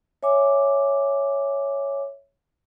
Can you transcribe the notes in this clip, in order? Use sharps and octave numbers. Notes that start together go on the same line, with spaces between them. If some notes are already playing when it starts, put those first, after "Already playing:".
C#5 E5 G#5 D6